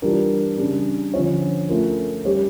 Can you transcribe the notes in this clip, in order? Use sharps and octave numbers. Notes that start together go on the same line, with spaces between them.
E3 G3 D4 F4 A#4
C#3 G3 D4
D3 F3 C#4 F4 C#5
A3 C#4 F4 A#4
G3 C#4 G4 C#5